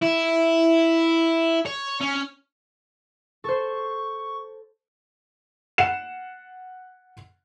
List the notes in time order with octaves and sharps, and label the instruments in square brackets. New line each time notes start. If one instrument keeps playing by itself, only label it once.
[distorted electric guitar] E4
C#5
C#4
[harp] A4 C5 [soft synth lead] C#6
[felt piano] F#5 C7 E7